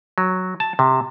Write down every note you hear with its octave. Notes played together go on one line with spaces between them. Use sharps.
F#3
A5
C3